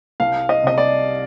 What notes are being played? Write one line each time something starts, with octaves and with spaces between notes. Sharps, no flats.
C2 F5
D#5
C3 D#5
D5